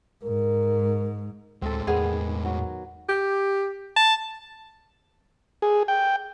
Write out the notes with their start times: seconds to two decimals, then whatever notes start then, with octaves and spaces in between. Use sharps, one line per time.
0.24 G#2 A#4
1.62 D2 A2 G#3 C4 A4
1.87 E2 D#3 B3 G#4
2.45 F#3
3.09 G4
3.96 A5
5.62 G#4
5.88 G5